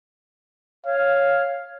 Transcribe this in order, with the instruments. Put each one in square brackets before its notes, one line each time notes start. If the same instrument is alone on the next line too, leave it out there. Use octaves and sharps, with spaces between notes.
[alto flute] C#5 [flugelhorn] F5